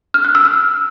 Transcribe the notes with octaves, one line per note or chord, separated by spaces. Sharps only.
F6
F#6
E6
F6